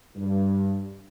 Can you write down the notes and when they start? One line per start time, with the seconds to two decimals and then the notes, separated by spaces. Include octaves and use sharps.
0.16 G2